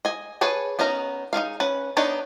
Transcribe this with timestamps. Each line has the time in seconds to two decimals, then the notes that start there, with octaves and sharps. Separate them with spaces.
0.05 D#5 G#5
0.41 G#4 B4 C#5 G#5 A5
0.79 B3 C#4 D#4 A#4 A#5
1.33 D#4 E4 G#4 F5
1.60 C#4 B4
1.97 B3 D4 D#4 B4 C#5